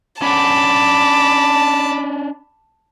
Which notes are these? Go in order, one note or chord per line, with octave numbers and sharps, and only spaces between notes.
C#4 D4 F#5 A5 B5 D6